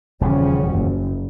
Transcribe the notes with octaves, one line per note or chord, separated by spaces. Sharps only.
D#1 E2 C#3 F3 G3 C#4
F#1